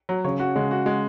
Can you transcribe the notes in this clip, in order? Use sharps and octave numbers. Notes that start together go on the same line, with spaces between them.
F#3
C#3 C#5
F#4
C#3 G#3
F#4
G#3